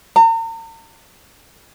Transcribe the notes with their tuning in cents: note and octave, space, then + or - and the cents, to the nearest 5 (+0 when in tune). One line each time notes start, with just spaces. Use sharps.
A#5 -45